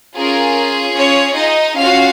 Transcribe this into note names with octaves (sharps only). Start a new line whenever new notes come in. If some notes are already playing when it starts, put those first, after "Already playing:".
C#4 F4 G#4 A#4
C#4 C#5
D#4 D#5
C#4 F4 F#4 F5